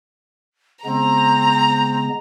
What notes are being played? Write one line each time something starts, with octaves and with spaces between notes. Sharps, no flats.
C#3 G#3 B3 C4 A#5